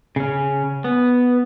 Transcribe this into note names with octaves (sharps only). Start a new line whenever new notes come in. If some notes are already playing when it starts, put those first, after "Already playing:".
C#3 C#4
B3